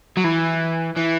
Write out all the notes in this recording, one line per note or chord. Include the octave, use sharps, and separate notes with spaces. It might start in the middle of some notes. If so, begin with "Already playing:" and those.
F#3
E3
E3